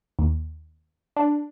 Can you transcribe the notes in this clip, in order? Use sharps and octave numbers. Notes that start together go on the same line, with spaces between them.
D#2
D4